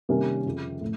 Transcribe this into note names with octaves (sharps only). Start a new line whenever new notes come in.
C3 D#3 G3 A#3 C#4
F2 C#3 F3
A2